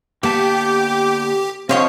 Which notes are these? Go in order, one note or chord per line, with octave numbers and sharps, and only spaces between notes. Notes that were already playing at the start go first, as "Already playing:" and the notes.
D3 A#3 B3 G4 G5 A5 D6 G6
D3 F3 C4 C5 C#5 D#5 F5